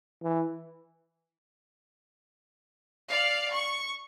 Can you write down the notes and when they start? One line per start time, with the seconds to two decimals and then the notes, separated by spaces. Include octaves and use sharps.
0.23 E3
3.09 D5 F5
3.52 C#6